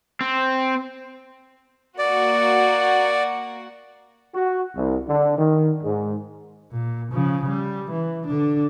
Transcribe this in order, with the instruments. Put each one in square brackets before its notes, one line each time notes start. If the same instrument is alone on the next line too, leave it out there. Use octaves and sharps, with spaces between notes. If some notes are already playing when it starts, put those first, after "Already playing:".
[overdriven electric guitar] C4
[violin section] A#3 F#4 [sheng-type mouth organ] D5
[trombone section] F#4
C2
D3
D#3
G#2
[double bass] A#2
C#3 F3
G3
E3
D3 D4